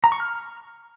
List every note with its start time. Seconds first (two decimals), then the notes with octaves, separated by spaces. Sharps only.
0.04 A#5
0.12 C#6
0.20 F6